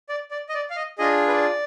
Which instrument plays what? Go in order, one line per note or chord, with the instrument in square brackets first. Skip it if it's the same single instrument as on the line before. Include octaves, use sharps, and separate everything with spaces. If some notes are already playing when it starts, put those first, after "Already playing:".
[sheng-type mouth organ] D5
D5
D#5
D5
F5
D#5
D4 F4 G#4 D#5
B4
D5